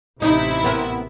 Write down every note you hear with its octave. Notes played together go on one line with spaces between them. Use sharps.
A1 C3 D#4 E4
B3 C4 A#4